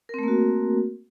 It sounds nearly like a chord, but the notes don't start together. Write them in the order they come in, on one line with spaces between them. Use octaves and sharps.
A#4 C4 A3 A#3 F#4